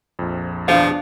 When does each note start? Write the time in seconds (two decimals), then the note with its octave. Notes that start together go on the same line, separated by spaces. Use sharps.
0.19 A#1 F2
0.68 B2 F3 D4 G#4 F5